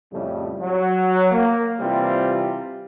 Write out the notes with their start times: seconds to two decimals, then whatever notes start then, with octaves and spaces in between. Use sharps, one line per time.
0.12 F2 A2 C#3 G3
0.61 F#3
1.32 A#3
1.80 C3 E3 G3 C4 E4 F4